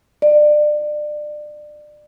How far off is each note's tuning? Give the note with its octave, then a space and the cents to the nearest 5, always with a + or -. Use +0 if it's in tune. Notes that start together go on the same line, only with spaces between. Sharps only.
D5 +30